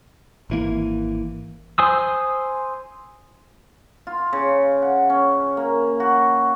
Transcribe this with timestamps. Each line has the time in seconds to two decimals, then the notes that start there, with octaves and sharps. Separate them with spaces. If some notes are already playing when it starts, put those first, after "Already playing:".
0.50 G#1 E3 A#3
1.78 C5 G#5 D#6 E6
4.07 F4
4.33 C#3
4.82 F#5
5.10 C#4
5.57 A#3
6.00 F#4